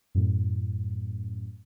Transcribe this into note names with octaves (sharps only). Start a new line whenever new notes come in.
F#2 A2